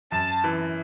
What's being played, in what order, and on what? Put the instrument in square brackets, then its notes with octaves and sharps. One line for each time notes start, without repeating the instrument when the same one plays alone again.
[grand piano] F#2 [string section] A5
[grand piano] E3